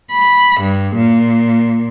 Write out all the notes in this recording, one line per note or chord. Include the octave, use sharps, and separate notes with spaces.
B5
G2
A#2